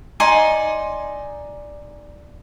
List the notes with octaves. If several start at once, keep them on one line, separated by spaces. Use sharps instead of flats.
D#4 D5 G#5 C6